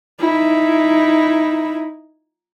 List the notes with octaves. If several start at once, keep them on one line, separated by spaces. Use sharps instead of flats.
D#4 E4